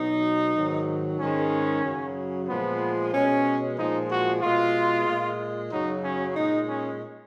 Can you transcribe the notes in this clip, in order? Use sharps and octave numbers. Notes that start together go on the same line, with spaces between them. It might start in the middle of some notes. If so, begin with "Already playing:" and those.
Already playing: B2 F#3 D#4
G#2 D#3 F#3
G#2 D#3 G#3 C#4
F#2 C#3 F#3
A#2 F3 G#3 B3
B2 G#3 C#4
A#2 F3 G#3 D#4
F#4
B2 G#3 F4
A#2 G#3
F#2 C#3 F#3 D#4
C#4
A#2 G#3 D#4
C#4